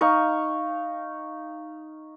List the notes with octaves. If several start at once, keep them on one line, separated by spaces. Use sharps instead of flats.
D#4 F5 C#6